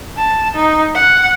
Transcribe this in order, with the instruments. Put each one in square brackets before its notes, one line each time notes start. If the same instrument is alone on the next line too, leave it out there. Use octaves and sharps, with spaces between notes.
[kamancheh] A5
D#4
F#5